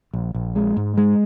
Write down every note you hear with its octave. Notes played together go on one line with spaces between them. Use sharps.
A#1
A#1
G#3
G#2
G#3